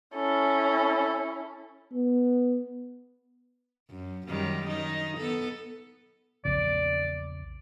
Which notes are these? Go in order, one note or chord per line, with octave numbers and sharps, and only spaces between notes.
C#4 E4 A4
B3
F#2
F#2 D#3 G3
D#3 D#4
B3 A4
A#1 E2 C#3 D5